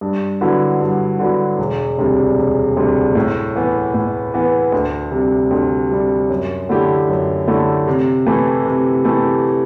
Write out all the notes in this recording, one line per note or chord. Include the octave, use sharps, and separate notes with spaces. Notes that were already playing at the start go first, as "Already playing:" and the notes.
G2
D3 F#3 B3 E4
G2
D3 F#3 B3 E4
E1
D2 C3 G3
E1
D2 C3 G3
A2
E3 B3
A2
E3 B3
D2
C3 G3
D2
C3 G3
F#2
D3 A3 E4 G4
F#2
D3 A3 E4 G4
C3
E3 A3 E4 G4
C3
E3 A3 E4 G4